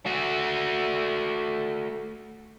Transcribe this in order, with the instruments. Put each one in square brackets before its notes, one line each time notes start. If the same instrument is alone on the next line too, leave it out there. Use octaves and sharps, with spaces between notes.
[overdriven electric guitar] A3 F#4